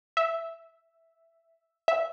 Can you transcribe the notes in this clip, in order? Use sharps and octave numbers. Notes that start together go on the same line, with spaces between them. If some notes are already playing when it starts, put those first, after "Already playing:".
E5
E5